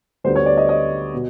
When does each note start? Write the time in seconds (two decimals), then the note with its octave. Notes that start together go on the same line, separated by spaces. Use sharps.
0.24 D2 D3 G3 B3 C5
0.36 C#5
0.46 D5
0.57 D#5
0.69 D#5
1.14 B2